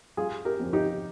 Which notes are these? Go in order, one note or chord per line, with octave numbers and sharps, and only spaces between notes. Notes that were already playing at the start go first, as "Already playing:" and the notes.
G3 F4 G#4
G4 A#4
F2
D#4 G4